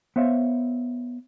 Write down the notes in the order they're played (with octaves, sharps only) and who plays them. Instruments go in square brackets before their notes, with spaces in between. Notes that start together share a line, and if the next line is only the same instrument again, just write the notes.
[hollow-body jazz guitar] B3 C5 C#5 E5 F5